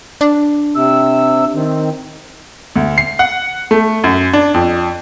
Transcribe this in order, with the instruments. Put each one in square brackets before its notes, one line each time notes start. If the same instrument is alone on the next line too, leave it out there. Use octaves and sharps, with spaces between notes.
[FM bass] D4
[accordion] C3 E6
D#3 C4
[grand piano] D2
C7
F#5
A3
F#2
D4
F2